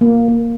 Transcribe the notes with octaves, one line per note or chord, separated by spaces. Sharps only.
A#3
A#3